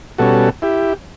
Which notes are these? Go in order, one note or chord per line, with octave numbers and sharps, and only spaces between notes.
B2 G3 C#4 F#4 A4
E4 G4